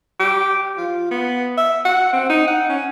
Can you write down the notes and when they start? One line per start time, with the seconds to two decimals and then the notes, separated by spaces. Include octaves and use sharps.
0.20 G4
0.77 F4
1.11 B3
1.57 E5
1.85 F#5
2.13 C4
2.29 D#4
2.47 F#5
2.69 C#4